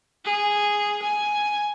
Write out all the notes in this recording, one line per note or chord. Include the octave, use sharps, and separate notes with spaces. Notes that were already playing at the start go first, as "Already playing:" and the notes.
G#4
G#5